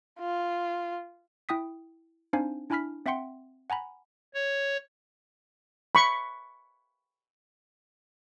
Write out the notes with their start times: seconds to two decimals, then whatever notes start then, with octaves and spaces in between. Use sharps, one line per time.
0.20 F4
1.49 E4 G5 D#6 B6
2.33 C4 D4 D#4 C5 F5 G#5
2.70 D4 E4 G#5 B5 F6 B6
3.06 C4 E5 F#5 G5 C6 C#7
3.70 F#5 G#5 A#5 B5
4.34 C#5
5.95 B5 C#6